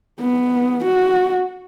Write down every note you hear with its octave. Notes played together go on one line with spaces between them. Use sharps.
B3
F#4